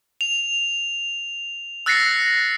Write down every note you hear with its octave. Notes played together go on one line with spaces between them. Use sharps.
F7
E6 F#6 A6 A#6 C7 C#7